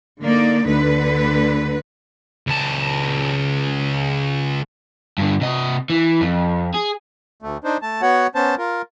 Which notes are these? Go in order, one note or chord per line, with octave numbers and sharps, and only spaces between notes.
D3 A#3 D#4 D5
D2 D3 B4
C#2 A5
G2 D3
C3 D#5
E3
F2
G#4
D2 A3
D4 D#4 C5
A3 A5
B3 F#4 C#5 F#5
B3 C#4 C5 A5
F4 A#4